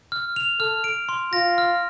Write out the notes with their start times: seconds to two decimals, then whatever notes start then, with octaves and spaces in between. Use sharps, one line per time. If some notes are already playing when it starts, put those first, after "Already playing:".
0.12 F6
0.36 F7
0.60 A4 F6
0.84 D7
1.09 C6
1.33 F4 A#6
1.58 F6